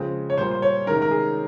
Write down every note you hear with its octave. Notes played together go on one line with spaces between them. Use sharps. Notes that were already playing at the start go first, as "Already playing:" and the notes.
Already playing: C#3 F3 G#3 C4
C#5
A#2 G3 A#3 C5
C5
C#5
C3 D#3 G#3 C#4 A#4
A#4
G#4